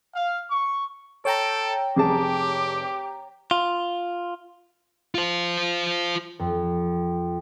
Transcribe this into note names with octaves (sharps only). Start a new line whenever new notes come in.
F5
C#6
A4 C#5 G5 A#5 D7
F1 G4 G#4 A5 D6
F4
F4 C5
F2